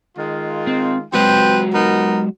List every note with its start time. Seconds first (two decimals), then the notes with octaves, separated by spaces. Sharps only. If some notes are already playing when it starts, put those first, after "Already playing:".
0.17 D#3 G#3 F4
0.67 C4
1.13 F#3 G#3 C4 F#4 B4 G5
1.74 B3 D#4 A#4